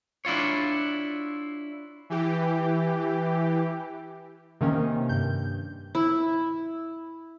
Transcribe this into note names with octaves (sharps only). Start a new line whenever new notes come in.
D4 E4 F4 C#5
E3 G4
C3 D#3 A#3 C#4
G2 G6
E4